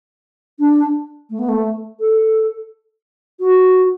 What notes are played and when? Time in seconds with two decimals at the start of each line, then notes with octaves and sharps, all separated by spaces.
0.59 D4
1.30 A3
1.39 B3
1.48 A3
2.00 A4
3.40 F#4